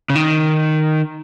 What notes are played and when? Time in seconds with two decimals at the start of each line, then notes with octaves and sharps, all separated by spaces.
0.10 C#3
0.15 D#3